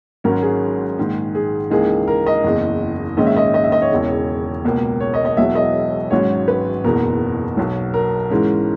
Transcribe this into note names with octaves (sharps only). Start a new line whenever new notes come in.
G#1 G#2 F#3 C#4 A#4
G#4
A#1 G#2 D#3
G#4
C#2 C#3 E3 A#3 D#4 G#4
A#4
D#5
F#1 E2 C#3
A#1 G#2 D#3 G#3 C#4 D#5
E5
D#5
D#5
E5
D#5
C#5
E1 E2 C#3
C#2 B2 A#3
C#5
D#5
D#5
E1 E2 B2 F#3 E5
D#5
G#1 G#2 F#3 C#4 C#5
B4
F#1 E2 B2 A#4
B1 B2 F#3
A#4
G#2 E3 G#3 C#4